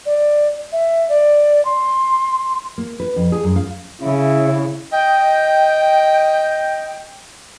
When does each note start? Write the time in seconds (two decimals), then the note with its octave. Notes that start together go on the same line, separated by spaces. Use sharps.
0.06 D5
0.72 E5
1.09 D5
1.65 C6
2.78 A#3
3.00 B4
3.16 F2
3.32 G#4
3.44 F#2
3.56 F5
4.02 C#3 E4
4.93 D#5 G5